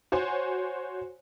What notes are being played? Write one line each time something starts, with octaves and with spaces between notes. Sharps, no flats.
F#4 C5 C#5 G#5